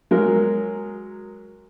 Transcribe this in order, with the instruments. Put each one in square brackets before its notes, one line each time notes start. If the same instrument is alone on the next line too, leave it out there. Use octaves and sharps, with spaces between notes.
[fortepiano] F#3 G#3 A#4